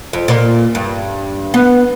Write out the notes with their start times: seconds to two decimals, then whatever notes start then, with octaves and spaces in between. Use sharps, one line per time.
0.13 F2
0.28 A#2
0.75 G2
1.54 B3